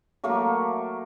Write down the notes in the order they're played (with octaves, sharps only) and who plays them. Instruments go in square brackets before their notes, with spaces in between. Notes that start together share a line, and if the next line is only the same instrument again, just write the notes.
[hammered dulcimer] F#3 A3 A#3 A4